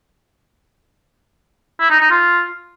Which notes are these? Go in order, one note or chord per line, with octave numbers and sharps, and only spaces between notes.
E4
D#4
D#4
F4